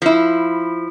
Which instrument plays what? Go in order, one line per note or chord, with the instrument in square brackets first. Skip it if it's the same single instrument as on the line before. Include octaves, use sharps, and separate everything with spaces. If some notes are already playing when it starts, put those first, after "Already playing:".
[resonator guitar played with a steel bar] F3 E4